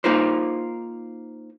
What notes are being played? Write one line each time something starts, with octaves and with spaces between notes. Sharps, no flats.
A#3 D#4 F4 A#4 C5